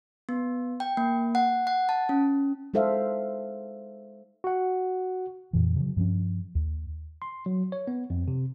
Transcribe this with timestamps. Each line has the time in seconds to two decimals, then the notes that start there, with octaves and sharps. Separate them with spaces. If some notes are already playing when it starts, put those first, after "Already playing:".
0.29 B3
0.80 G5
0.97 A#3
1.35 F#5
1.67 F#5
1.89 A5
2.09 C#4
2.74 G#3 D#4 A4 C5 E5 F5
4.44 F#4 F#5
5.53 F2 A#2 E3
5.76 C#3 F#3
5.96 G2 F3 G#3 C#4
6.55 D#2
7.22 C6
7.46 F#3
7.72 C#5
7.87 B3
8.10 F2
8.28 C3